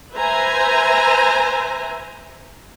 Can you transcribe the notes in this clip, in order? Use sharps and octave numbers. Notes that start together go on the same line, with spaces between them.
B4 C5 E5 G#5 A#5